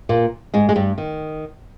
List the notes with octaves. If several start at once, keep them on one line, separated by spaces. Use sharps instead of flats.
A#2 A#3
G#2 G#3
G#3
G2 G3
D#3